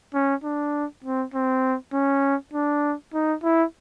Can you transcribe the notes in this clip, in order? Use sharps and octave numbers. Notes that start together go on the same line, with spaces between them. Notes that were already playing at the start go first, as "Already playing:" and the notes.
C#4
D4
C4
C4
C#4
D4
D#4
E4